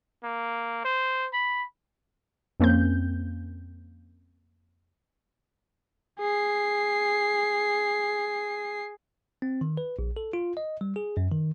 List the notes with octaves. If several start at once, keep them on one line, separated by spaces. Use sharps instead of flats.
A#3
C5
B5
F2 A#3 C4 C#4 G6
G#4 C7
C4
D#3
B4
A#1
A4
F4
D#5
G3
G#4
F#2
D#3